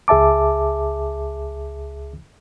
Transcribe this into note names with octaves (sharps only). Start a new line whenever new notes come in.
C#2 G#4 E5 A5 D6